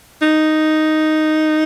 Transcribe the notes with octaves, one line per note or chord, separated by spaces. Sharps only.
D#4